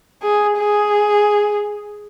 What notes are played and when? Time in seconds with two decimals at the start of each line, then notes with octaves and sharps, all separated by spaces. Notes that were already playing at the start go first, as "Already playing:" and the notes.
0.22 G#4
0.57 G#4